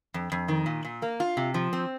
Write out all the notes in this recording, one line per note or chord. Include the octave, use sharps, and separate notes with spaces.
F2
F2
D#3
A#2
A#2
A#3
F4
C3
F3
C4